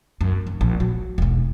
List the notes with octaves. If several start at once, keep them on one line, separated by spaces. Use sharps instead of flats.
F#2
F1
A#1
F#3
E1 B1